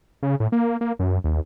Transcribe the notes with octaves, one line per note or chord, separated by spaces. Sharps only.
C#3
A2
A#3
A#3
F#2
D#2